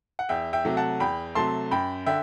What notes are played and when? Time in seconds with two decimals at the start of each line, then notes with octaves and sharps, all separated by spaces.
0.19 F#5
0.29 E2 E5 G5
0.53 E5 G5
0.65 C3 F#3 A3
0.77 F#5 A5
1.00 E2 G5 B5
1.35 C3 F#3 A3 A5 C6
1.71 F#2 G5 B5
2.06 D3 E5 G5